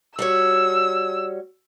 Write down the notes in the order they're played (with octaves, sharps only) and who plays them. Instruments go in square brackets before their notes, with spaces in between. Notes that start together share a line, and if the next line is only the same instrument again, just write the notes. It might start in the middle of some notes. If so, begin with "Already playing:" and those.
[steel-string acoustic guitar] G3 F#4 C#5 [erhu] E6